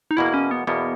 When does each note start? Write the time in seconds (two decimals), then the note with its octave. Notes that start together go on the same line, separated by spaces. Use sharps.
0.11 D#4
0.17 E2 B2 A#3 E4
0.34 C#4
0.51 B3
0.67 E2 B2 A#3 B3